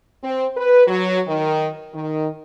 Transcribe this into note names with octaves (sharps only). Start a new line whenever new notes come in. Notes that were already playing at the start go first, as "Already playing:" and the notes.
C4
B4
F#3
D#3
D#3